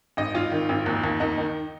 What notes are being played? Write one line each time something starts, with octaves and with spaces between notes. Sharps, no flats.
G#1 D#5
G#1 F4
D#3
G#1
D#2
D#2
D#2 D#4
D#3 D#4